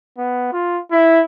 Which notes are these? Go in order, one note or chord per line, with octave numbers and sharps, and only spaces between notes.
B3
F4
E4